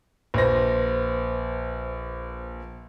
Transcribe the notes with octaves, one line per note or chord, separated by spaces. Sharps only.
A#1 B4 C5 A#6